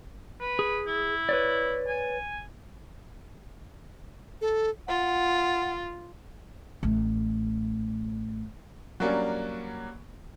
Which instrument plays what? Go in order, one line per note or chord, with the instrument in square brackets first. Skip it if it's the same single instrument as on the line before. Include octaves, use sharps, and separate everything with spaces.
[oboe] B4
[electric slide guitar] G#4
[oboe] E4
[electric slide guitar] B4 C#5 D5
[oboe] G#5
[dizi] A4
[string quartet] F4 [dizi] F#5
[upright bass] A1 A3
[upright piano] F#3 G3 A#3 C#4 D4